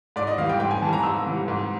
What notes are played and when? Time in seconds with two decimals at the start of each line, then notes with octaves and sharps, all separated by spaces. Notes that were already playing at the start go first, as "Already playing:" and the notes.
0.16 G#2 D5
0.27 D#5
0.38 E3 F5
0.43 G3
0.49 G5
0.60 G#2 G5
0.71 G#5
0.82 E3 G3 A5
0.93 A#5
1.03 G#2 E6
1.26 E3 G3
1.48 G#2